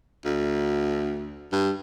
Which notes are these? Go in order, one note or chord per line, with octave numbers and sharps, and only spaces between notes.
D2
G2